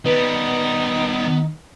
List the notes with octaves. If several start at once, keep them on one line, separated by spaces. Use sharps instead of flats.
D#3 G3 B3 D#4 B4